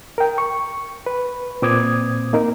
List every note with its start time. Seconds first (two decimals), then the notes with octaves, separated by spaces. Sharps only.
0.18 A#4 G5
0.38 C#6
1.06 B4
1.62 A#2 C4 D6 D#6 G#6
2.33 A#3 D#4 A#4